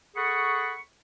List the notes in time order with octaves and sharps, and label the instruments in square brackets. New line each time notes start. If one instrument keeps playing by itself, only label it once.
[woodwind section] G#4 A4 F#5 B5 C#6